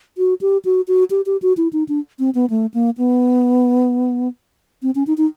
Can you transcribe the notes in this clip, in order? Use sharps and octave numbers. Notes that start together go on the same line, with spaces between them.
F#4
G4
F#4
F#4
G4
G4
F#4
E4
D#4
D4
C4
B3
A3
A#3
B3
C4
C#4
D#4
D#4